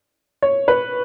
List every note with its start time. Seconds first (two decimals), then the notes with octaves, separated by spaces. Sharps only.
0.42 C#5
0.68 B4